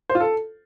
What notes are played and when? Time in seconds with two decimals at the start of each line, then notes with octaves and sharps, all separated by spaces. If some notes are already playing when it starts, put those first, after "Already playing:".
0.10 C5
0.15 F4
0.20 A4